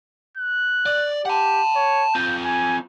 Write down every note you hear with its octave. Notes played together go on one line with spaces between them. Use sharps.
F#6
D5
G4 F#5 A5
C#5
C4 F4 G6
G#5